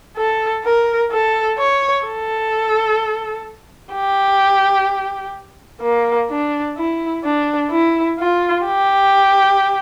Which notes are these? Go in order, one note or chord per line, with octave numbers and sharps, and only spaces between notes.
A4
A#4
A4
C#5
A4
G4
A#3
D4
E4
D4
E4
F4
G4